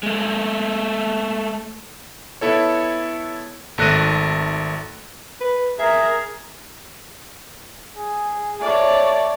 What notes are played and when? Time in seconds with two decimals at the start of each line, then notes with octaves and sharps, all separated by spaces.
0.03 G#3 A3
2.41 B3 E4 A4 C#5
3.78 G#1 A3 F#6 A#6 D#7
5.41 B4
5.79 G#4 A#4 E5
7.97 G#4
8.60 A3 C#5 D5